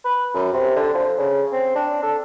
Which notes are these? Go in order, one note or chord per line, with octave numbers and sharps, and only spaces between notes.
B4
F#2
C3
D3
F3
C#3
C4
D4
A4